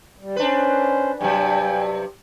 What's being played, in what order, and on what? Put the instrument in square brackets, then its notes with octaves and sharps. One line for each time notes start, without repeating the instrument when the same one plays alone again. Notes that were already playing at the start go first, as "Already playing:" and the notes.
[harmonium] G3
[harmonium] C#4 C5 [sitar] D4 B4
[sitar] G2 C3 F#3 [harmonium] G5 G#5